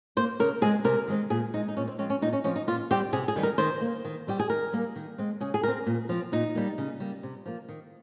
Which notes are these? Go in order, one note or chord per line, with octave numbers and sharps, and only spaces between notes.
A#3 C5
C#3 A#4
G#3 C4 G#4
C3 A#4
D#3 G#3 C4
A#2 G#4
G#3 C4 D#4
D#4
A#2 C#4
C4
F3 G#3 C4 C#4
C#4
A#2 D#4
C#4
F3 C4 C#4
D#4
A#2 F4
G3 C4 G4
C3 G#4
G#4
D#3 G3
A#4
D#3 C5
A#3
D#3
G3 C4 G4
G#4
D#3 A#4
G3 A#3
D#3
G#3 C4
C#3 G#4
G#4
G3 A#4
C4
A#2
F3 C4
A#2 D#4
G3 A#3
C#3
G3 A#3
C3
F3 A#3
D#3